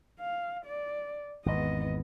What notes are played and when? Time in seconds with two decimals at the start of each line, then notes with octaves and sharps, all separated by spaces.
0.20 F5
0.65 D5
1.46 G#1 E2 B3 D#5